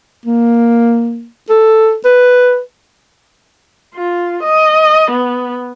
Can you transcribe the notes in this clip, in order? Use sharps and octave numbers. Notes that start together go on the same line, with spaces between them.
A#3
A4
B4
F4
D#5
B3